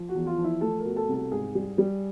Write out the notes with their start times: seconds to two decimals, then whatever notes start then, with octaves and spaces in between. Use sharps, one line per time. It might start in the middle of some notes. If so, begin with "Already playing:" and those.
Already playing: F3
0.09 F#4
0.15 E2
0.27 F4
0.38 F3
0.44 E4
0.61 A3 A4
0.79 A#4
0.85 B2
0.96 A4
1.09 C2
1.14 A4
1.31 G#2 G#4
1.55 G3
1.78 G3